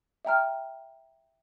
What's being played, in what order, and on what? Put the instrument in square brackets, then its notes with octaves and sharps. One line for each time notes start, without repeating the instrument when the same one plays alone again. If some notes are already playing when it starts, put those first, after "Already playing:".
[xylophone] E5 G5 A#5 F6